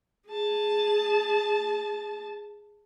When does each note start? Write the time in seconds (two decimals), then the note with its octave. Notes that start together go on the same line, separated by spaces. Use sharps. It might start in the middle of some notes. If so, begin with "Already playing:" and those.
0.27 G#4 A5